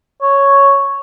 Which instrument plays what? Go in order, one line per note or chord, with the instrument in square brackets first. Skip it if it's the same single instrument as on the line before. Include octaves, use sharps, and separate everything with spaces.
[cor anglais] C#5